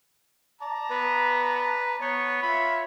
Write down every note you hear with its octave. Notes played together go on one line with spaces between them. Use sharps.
D5 A5 A#5
B3 B4
B3 C#5
F4 E5 B5